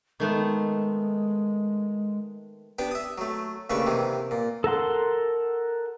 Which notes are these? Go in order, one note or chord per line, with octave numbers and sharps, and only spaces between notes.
D#3 G#3 A3 B3
B3 D4 G4
E5 D#6
F#3 A3
D#2 C#3 A3 D4 B4 C#6
C3 D#3 E3
A#2
A4 A#4 F#5 C6